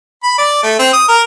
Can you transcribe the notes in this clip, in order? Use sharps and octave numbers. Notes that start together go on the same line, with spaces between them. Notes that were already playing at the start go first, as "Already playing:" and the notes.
B5
D5
A3
C4
D#6
A#4